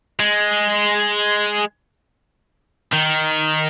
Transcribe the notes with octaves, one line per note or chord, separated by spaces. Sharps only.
G#3
D#3